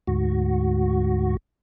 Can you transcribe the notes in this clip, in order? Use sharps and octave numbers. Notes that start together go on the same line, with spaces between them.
D2 G#2 F#4